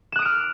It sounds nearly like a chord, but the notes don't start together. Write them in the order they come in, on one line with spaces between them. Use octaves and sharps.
E7 F#6 D#6 D7 F6